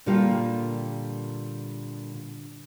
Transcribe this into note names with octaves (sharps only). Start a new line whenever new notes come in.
A#2 D3 G3 A#3 F4 G4